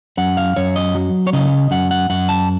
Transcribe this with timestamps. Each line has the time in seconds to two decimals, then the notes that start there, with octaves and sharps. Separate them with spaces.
0.18 F#2 F#5
0.37 F5
0.56 F#2 C#5
0.76 D#5
0.95 F#3
1.27 C#5
1.33 C#3 D#5
1.71 F#2 F#5
1.91 F#5
2.10 F#2 F#5
2.29 A5